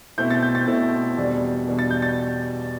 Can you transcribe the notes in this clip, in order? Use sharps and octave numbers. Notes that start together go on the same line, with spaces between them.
B2 A3 C4 E4 G6
A6
G6
A6
B2 A3 C4 E4
E2 B2 G3 D4
E2 B2 G3 D4
A6
G6
A6